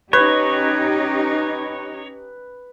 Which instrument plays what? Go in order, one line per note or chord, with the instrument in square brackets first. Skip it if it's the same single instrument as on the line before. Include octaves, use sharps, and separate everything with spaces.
[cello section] C#4 D#4 G4 [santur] B4 [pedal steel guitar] C#5